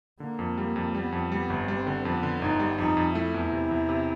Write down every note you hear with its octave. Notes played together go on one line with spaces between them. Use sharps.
D3 A#3
F2
G3
F2
G3 B3
F2
G3 B3
G1
G3 C4
D3
F2 B3
D3
G1 D#4
G3
F2 D#4
F2
A3 E4
E2
C3
E2
C3